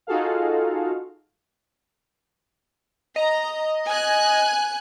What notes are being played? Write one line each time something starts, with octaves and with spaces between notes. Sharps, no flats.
D#4 F4 F#4 G#4 A4 F5
D#5 A#5
G#5 F#6